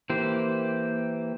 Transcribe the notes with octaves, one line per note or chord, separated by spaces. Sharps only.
E3 A#3 G4 C5